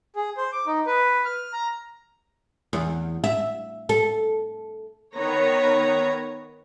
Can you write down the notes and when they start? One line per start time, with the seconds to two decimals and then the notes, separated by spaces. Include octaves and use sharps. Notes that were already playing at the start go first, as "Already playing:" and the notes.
0.16 G#4
0.37 C5
0.52 D6
0.67 D#4
0.87 B4
1.25 F6
1.53 A#5
2.73 E2
3.24 E5
3.89 A4
5.17 D#3 B3 C#5 A#5